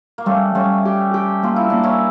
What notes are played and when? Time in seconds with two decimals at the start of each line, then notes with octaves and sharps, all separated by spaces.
0.18 A#3
0.26 G3 A3 C#4
0.55 G3 A3 C#4
0.85 G4
1.14 G4
1.43 A#3 F4
1.56 E4
1.70 A#3 D4
1.83 C#4 E4